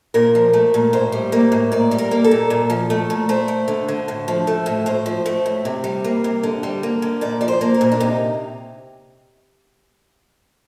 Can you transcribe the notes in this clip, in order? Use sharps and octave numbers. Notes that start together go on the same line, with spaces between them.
A#2 A#4
F3
A3
A#2
A2 C5
G3
A#3
A2
A#2 D5
G3
A#4
A#3
A4
A#2
A#2
F3
A3
A#2
A3 C5
A3
D3
D3
A2
F3
A3
A2
A2 C5
F3
A3
A2
C3
G3
A#3
C3
D3
G3
A#3
D3
A#2 D5
F3 D5
C5
A#3
A#4
A#2
D4
C3 D#4